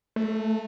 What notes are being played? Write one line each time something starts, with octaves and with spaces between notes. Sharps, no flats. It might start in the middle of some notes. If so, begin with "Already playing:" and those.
A3